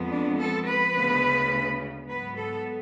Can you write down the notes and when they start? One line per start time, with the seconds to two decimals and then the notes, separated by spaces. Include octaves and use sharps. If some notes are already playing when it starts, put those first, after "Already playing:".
Already playing: F2 F3 G#3 B3
0.10 D4
0.39 A4
0.66 B4
0.95 D2 C#3 G#3 B3
2.07 G#2 F#3 B3 B4
2.36 A4